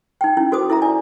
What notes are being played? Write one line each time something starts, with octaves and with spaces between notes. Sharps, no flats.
D#4 G5
C#4 E4
F#4 A4 C5 D6 D#6
E4 A4 E5 A#5
E4 D5 G#5